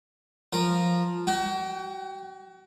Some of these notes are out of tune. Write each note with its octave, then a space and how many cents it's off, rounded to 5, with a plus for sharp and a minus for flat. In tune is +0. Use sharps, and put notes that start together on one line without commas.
F3 +0 A#4 +0
F#4 +35 G5 +0